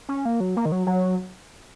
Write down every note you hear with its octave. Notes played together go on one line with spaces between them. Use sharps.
C#4
A#3
F#3
A#3
D#3
F#3
F#3